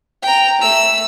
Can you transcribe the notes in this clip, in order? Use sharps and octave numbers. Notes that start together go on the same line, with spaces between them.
G5 A#5
A3 E6